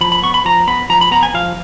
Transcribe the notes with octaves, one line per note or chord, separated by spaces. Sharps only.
F3 B5
B5
B3 C#6
B5
F3 A#5
B3 B5
F3 A#5
B5
B3 A#5
G#5
F3 F5